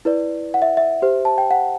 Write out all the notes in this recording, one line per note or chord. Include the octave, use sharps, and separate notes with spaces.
E4 B4 D5
F#5
E5
E5
G4 C5
A5
G5
F#5